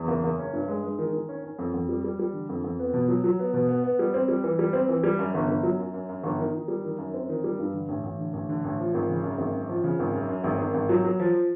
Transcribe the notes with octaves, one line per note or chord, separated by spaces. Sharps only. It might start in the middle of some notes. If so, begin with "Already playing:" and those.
Already playing: E2
F#1
F#1
C#4
G2
G#3
G#3
D#3
D#3
C#4
C#4
F2
F2
G3
G3
G3
D3
F2
F2
B3
B2
F#3
F#3
B3
B2
B3
B3
G3
C4
G3
E3
G3
C4
E3
G3
F#2
G1
G1
F#3
F#2
F#2
F#2
G1
D#3
D#3
G3
D#3
F#2
C4
D#3
G3
G2
D3
A1
A1
D3
A1
D3
A1
F3
G#1
C#3
F#2
G#1
F#2
F3
C#3
G#1
F#2
F#2
G#1
G#1
G#1
F#3
F#3
F3